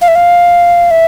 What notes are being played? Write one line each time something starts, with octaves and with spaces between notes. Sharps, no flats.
F5
E5
F5
E5